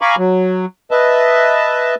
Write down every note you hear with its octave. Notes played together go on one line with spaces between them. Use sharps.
F5 G#5 A#5 B5 C#6 D6
F#3
B4 D#5 E5 A5